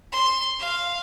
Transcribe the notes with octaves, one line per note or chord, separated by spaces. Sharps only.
C6
F5